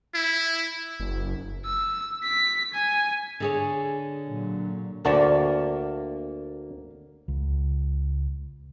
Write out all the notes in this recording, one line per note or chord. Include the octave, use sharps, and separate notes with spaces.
E4
F#1
E6
B6
G#5
D3 G#4 C#5
A#2 F#3
D2 A#3 F#4 D5 A5
C#2